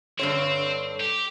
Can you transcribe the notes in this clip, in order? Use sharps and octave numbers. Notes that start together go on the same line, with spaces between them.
G2 D3 C4 C#5
G4